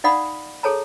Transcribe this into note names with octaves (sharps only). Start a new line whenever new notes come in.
D#4 D5 F5 F#5 B5 D#6
G#4 A4 C#5 A5 A#5